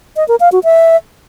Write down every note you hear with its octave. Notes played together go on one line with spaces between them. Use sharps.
D#5
A#4
F5
F#4
E5